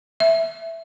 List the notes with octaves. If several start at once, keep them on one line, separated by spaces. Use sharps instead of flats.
E5